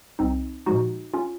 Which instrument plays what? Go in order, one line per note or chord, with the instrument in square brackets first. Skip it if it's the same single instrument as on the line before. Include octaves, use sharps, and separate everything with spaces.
[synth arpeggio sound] C2 C4 D#4
A#2 F3 G#3 D#4 F#4
C#4 F4